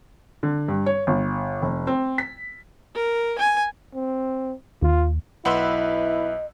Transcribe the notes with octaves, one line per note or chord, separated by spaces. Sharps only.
D3
G2
C#5
G1
F1
C4
B6
A#4
G#5
C4
D#2 F4
B1 E4 B4 D#5 F#5 B5 C6 E6